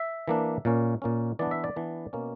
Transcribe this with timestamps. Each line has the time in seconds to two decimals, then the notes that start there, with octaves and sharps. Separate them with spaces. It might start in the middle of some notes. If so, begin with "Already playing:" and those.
Already playing: E5
0.28 E3 A#3 D4
0.65 A#2 A#3 C#4
1.02 A#2 A#3 C#4
1.39 E3 B3 D4 D5
1.51 E5
1.64 D5
1.76 E3 B3 D4
2.13 B2 A#3 C#4